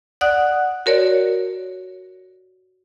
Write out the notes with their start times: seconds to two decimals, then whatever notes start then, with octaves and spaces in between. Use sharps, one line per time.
0.21 D5 F#5 D#6 F#6
0.86 F#4 A#4 C#5 D5